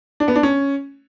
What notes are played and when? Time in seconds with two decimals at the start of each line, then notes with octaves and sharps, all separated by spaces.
0.20 D4
0.28 B3
0.36 D4
0.43 C#4